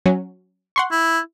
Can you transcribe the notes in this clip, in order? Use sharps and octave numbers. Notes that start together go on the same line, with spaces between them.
F#3 C#4
F#5 C6 C#6
E4